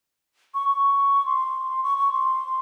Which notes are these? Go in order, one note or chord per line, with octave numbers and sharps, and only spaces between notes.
C#6
C#6
C6
C#6
C#6
C6